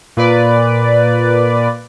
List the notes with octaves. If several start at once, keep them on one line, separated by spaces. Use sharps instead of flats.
A#2 B4 D5